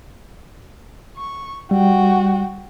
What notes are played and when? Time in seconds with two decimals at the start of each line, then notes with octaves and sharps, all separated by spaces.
1.17 C#6
1.71 G3 F#4 G5